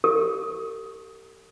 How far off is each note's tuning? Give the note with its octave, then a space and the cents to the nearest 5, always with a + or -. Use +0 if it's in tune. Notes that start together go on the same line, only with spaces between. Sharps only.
G4 -5 A#4 -45 D#6 +20